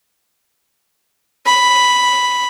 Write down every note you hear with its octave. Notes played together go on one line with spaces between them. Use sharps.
B5